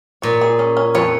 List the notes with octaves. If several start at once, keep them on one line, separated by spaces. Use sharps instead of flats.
A#2 C#5
G#4
C#4
C#4
F2 C#5